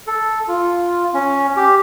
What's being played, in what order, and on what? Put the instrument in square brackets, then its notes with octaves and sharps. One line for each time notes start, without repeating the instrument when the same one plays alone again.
[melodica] A4
F4
C#4
G4